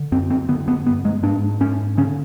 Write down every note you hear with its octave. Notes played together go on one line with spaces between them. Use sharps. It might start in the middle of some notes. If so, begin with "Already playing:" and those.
Already playing: D3
F#2 C4
C4
D3 B3
B3
G2 B3
G#3
G#2 D4
G#2 C#4
D3 C#4